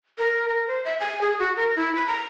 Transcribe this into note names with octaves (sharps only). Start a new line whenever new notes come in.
A#4
A#4
C5
E5
G#5
G#4
F#4
A#4
E4
B5
A#5